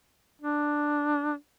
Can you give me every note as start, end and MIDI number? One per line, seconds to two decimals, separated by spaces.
0.42 1.35 62